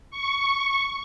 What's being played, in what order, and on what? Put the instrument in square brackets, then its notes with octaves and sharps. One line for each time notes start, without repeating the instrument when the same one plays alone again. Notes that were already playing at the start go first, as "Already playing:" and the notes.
[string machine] C#6